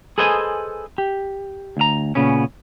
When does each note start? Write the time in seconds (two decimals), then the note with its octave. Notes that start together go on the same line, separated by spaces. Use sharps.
0.18 G#4 A4 B4 C5 D#5 G#5
0.98 G4
1.77 D2 A#5
2.15 A#2 C#3 B3 C#4